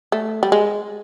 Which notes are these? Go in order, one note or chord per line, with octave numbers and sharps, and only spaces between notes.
A3
G3
G#3